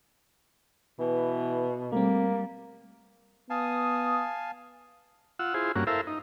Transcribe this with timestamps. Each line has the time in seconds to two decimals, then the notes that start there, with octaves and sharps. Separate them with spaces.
1.00 B2 E3
1.92 G3 A3 A#3 C4
3.50 B3 F5 G#5 A5 D#6
5.39 F4 F#5 E6
5.54 E4 F4 G#4 C5
5.75 G2 A#3 C#4 F#4
5.87 E4 A4 A#4 C5 E5 F5
6.07 D#4